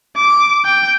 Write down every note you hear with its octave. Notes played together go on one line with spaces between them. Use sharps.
D6
G5